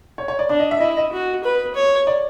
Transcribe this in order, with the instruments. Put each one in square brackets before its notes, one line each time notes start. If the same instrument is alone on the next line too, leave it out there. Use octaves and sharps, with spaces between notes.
[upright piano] C#5
C#5
D5
[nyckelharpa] D4 [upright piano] D5
[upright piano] D#5
E5
[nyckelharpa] E4 [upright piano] D#5
[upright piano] D#5
[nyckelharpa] F#4
B4
C#5
[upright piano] D5